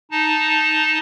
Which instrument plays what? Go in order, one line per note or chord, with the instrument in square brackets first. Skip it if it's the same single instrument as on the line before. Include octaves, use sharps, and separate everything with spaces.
[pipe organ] D#4 A5